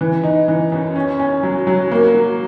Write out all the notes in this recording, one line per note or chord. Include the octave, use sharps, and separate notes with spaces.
E3
D#4
E3
F#2
C#4
C#4
F#3
F#3
A#3
F#3